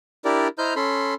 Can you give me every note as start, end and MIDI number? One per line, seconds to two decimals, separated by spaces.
0.25 0.48 62
0.25 0.48 64
0.25 0.48 67
0.25 0.48 70
0.25 0.48 74
0.58 0.74 64
0.58 0.74 72
0.58 0.74 75
0.58 0.74 82
0.58 0.74 89
0.58 0.74 91
0.76 1.14 61
0.76 1.14 69
0.76 1.14 83
0.76 1.14 84